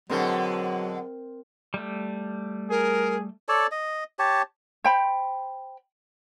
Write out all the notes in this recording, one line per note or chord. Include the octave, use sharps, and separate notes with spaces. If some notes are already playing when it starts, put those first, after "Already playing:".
B2 D3 F#3 G#3 C4 A#4 C5
G3 A3
G#4 A#4
A4 C#5 D5 A5
D#5
G4 C#5 A5
C5 G5 B5